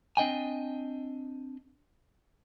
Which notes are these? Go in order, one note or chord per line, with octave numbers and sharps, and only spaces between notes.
C4 D4 D#5 G5 G#5